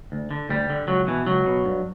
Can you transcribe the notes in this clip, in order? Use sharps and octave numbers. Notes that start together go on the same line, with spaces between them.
D2
D3
D2 G3
D3
C#2 F#3
B2 E3
C#2 F#3
B2
G2